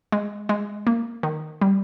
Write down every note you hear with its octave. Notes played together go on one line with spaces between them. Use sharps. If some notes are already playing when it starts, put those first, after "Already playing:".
G#3
G#3
A#3
D#3
G3